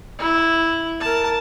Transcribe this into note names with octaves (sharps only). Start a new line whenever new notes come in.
E4
A#4 A5